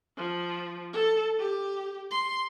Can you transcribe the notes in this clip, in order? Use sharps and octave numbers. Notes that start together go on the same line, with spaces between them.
F3
A4
G4
C6